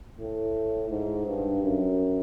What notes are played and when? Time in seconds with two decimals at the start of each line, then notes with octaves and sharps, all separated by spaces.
0.19 A2
0.90 G#2
1.27 G2
1.62 F#2